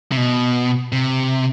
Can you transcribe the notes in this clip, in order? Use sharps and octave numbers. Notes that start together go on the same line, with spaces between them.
C3
B2
C3